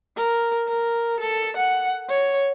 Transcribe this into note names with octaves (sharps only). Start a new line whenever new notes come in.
A#4
A#4
A4
F#5
C#5